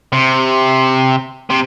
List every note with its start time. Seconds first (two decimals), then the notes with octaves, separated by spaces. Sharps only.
0.13 C3
1.50 C3